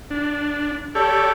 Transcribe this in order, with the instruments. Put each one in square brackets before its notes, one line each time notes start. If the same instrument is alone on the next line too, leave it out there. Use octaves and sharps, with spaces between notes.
[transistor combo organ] D4
[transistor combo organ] G4 C#5 D5 [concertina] A4